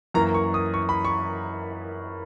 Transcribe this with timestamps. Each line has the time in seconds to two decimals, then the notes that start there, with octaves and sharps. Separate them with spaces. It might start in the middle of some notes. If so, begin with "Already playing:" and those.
0.14 F#2 E3 A#3 A#5
0.34 C#6
0.54 D#6
0.74 C#6
0.89 B5
1.05 C#6